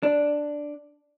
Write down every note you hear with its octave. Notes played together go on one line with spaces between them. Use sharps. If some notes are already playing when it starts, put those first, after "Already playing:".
D4